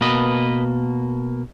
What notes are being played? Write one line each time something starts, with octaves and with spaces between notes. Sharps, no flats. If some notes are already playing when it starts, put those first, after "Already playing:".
B2 A#3 B4 D#5